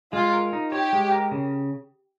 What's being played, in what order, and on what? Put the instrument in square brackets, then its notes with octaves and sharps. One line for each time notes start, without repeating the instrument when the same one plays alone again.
[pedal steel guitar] G#3 [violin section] F4
[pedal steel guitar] A#4
D#4
[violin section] G4 [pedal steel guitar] C#5
[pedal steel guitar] G#3
A#4
C#3